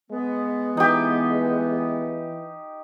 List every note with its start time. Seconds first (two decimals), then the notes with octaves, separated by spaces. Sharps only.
0.11 G#3 B3
0.77 E3 D#4 G4